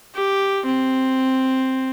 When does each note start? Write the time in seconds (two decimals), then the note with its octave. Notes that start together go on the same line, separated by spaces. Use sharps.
0.15 G4
0.66 C4